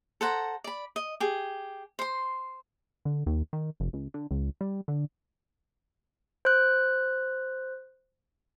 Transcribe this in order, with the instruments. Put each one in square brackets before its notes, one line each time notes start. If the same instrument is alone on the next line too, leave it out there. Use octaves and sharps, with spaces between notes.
[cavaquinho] A4 C5 F#5 A#5
D5 B5
D#5
G4 G#4
C5 C6
[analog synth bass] D3
D#2
D#3
F1
C#2
D3
C#2
G3
D3
[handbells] C5 F#6